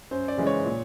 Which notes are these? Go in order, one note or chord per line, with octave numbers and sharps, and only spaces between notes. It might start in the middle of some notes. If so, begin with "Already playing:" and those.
F#2 C5
D5
C#3 E3 G#3
C#5
A#2